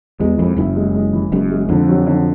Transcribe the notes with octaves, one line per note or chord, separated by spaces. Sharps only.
E2 G#3
F2 E3
F#1 F#2 E4
G#3
G#3
E3
F#1 F#2 G#3
G#3
F2 D3
F#3
D3